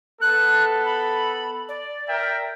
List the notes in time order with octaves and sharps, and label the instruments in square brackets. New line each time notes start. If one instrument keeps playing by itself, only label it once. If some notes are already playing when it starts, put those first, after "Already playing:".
[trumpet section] B3 A4 [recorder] F#6
[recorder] B5
D5
[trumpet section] A#4 E5 G5